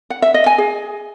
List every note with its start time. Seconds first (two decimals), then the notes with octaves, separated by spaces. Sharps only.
0.10 F#5
0.22 E5
0.34 D#5
0.46 G#5
0.58 G#4